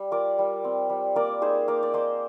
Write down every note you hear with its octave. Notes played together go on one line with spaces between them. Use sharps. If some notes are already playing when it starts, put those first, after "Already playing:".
Already playing: G3
F4 A#4 D5
G3
C4
G3
A#3 A#4 D5
D#4 G#4 C5
A#3 A#4 D5
D5
A#3 C5 D#5